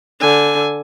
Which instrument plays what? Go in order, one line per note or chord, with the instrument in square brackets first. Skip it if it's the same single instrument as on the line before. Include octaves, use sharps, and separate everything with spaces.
[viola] D3 G#5